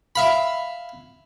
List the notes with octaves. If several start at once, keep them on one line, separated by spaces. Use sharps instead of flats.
E5 F5 B5